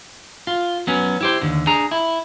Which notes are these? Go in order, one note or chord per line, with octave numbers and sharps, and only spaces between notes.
F4
F#3 B3 C#4
E4 G4 C5
D#2 D3
D4 G#4 A#5
E4